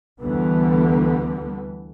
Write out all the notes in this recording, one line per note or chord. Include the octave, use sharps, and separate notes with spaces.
D2 D3 E3 G3 B3